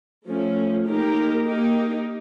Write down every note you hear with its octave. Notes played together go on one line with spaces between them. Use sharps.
F3 A3 C#4
A#3 D#4 G4 A#4
A#3 D#4 G4